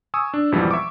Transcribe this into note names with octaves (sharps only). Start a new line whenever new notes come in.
G#5 C#6 D#6 E6
D4
G#1 F2 B2 E3 F3 G3
E5 C#6 D6